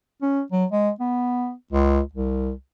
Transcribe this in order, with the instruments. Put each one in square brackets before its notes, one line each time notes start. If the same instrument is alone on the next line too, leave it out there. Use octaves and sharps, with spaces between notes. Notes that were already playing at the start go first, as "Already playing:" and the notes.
[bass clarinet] C#4
F#3
G#3
B3
C#2
C2